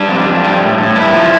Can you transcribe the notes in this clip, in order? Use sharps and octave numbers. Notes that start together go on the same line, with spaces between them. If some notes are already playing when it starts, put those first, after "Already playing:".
Already playing: G3 D4
F2
F2
G3
A2
A2
G2 E4
F3